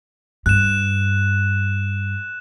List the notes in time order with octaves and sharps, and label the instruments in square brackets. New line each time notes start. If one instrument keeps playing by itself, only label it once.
[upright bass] G2 [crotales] F#6 E7